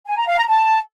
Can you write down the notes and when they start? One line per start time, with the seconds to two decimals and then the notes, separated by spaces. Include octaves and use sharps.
0.06 G#5
0.17 A#5
0.27 F5
0.37 A#5
0.48 A5